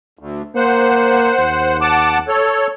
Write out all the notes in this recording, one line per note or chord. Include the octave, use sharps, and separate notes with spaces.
D2
A#3 C5 F#5
D#2
F#5 A5 D6
A4 C#5